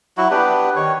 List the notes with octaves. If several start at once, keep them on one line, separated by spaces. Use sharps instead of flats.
F#3 E4 F#4
B3 D4 G4 B4
D#3 C#5